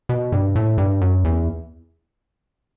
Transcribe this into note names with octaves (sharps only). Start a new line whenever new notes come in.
B2
G2
A2
G2
F#2
E2